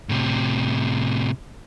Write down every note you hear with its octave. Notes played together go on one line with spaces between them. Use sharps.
A2 C3